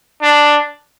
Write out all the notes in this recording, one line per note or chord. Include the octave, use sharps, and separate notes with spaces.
D4